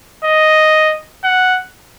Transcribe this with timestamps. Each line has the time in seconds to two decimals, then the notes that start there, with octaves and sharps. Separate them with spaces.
0.24 D#5
1.24 F#5